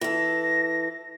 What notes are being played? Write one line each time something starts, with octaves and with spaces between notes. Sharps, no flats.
E3 A4 A#6